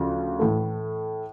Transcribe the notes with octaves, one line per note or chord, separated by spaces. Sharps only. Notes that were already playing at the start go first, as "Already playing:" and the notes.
Already playing: D2 C#3 F3
A2 E3 A3